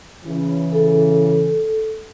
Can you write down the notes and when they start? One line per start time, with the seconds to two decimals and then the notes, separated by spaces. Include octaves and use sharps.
0.25 C#3 E3
0.72 A4